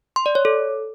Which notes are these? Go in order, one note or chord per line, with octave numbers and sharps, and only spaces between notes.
C6
D5
C#5
A4